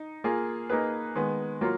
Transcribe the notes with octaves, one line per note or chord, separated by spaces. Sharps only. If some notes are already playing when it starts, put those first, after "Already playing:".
Already playing: D#4
A#3 F4 G#4
A#3 D#4 G#4 B4
D#3 G#3 B3
F#3 A#3 F4